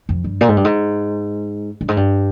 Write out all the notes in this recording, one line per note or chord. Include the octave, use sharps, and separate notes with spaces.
F2
G2
A#2
G#2
G2
G#2
G2
G#2
G2